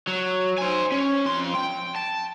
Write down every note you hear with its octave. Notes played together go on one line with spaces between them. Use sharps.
F#3
C5 G#5
C#4
F2 C6
G5
A5